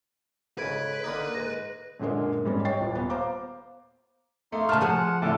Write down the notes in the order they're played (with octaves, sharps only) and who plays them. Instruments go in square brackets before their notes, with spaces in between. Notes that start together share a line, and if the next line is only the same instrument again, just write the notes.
[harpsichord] G#2 C#3 [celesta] A4 G#6 D7 [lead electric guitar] B4
[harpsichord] D3 A#3 D#4
[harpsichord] G#2 [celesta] A#6
[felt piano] F#2 A#2 D3 G#3 A#3
G#2 G3 C#4
C#5 D#5 G5 C#6 A6 C7
D#1
B3
C5 F5 A#5 D6
[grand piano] A3 [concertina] A#3 D#4 C6
[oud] C#3 A3 [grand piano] A5 F6
[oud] F3 G#4 C5 [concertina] F#5
[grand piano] A2 D3 E4 [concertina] A5 D6